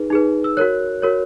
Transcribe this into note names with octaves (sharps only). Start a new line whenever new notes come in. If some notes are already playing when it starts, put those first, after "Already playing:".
Already playing: D#4 G#4 B4
D#4 G#4 B4
E6
F#4 A#4 C#5 F#6
F#4 A#4 C#5